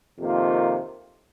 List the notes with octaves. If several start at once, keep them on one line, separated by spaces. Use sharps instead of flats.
F2 C3 D#3 A#3 F4